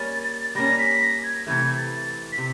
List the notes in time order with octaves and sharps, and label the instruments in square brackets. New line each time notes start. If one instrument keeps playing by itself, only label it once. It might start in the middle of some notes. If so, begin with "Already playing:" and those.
Already playing: [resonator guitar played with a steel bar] G3 A#3 C#4 [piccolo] A6
[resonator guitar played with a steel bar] G3 A#3 C#4 [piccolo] A#6
[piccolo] B6
A#6
G#6
[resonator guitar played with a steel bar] C3 E3 A3 [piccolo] G#6
[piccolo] A6
B6
[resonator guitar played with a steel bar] C3